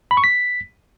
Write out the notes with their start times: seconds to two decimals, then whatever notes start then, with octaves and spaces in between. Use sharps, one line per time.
0.11 B5
0.17 C#6
0.24 B6